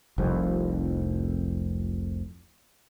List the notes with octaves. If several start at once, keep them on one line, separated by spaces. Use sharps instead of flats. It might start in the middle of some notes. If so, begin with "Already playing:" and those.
F1 C2 F2